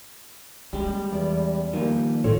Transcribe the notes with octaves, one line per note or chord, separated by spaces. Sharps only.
G3 G#3 C#4
E2 D5
D#3 F3 G3 A#3
A2 D#3 F4 A4 C#5